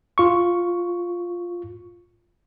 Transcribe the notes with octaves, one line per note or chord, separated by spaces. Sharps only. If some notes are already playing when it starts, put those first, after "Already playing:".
F4 C#6